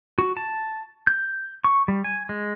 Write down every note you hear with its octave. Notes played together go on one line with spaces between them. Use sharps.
F#4
A5
G6
C#6
G3
G#5
G#3